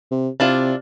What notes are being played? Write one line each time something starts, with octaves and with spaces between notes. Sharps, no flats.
C3
C3 D4 E4 F4